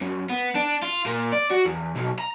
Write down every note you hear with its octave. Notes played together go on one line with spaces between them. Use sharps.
F#2
B3
D4
F4
A#2
D5
F#4
E2
B1
A#5